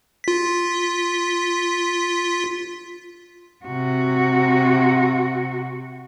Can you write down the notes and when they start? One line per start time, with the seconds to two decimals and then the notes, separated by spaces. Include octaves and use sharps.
0.24 F4 B6
3.66 C3 F#4